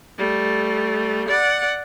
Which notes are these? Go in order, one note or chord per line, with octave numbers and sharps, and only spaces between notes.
G3 A3
D5 F#5